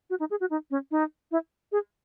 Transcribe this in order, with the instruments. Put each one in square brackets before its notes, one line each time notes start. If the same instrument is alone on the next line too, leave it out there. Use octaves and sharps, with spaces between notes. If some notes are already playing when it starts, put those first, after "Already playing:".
[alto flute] F#4
D#4
G#4
F#4
D#4
C#4
D#4
E4
G#4